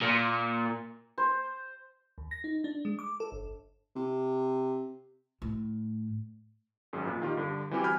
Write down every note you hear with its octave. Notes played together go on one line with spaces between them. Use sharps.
A#2
C5
D#2
A#6
D#4
D4
G#3
D6
A4
G1
C3
A2
G#1 F#2 G#4
F2 A#2
D#3 F4 G4
G2 D3
E3 G3 C4 F#4 G4 G#5
G#5 B5 F6 G6